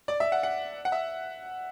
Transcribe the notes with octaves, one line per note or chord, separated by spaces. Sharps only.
D5
E5
F#5
F#5
F#5
E5